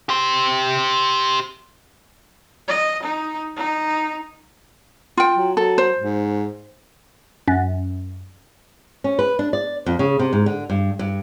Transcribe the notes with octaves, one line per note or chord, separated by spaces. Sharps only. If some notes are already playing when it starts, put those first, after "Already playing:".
G4 C5
D#5
D#4
D#4
F4 G5
F#3
F#3 A4
C5
G#2
F#2
C#4
B4
D4
D5
F2
C#3
C3
G#2
D3
G2
G2